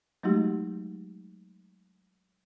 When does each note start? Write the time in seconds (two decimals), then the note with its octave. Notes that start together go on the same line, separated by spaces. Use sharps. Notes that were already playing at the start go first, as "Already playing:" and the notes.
0.23 F#3 G#3 A3 D#4 F#4 G4